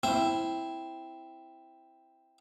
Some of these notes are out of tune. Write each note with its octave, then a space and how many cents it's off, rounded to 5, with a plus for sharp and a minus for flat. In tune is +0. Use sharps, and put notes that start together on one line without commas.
C4 +0 E4 +0